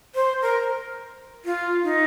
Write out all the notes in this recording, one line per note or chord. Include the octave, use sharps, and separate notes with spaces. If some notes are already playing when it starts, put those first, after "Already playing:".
C5
A#4
F4
D#4